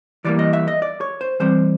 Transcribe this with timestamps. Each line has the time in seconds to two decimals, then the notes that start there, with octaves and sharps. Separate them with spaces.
0.25 E3 G3 A#3 D5
0.39 D#5
0.53 E5
0.68 D#5
0.82 D5
1.01 C#5
1.21 C5
1.40 E3 G3 C4 C5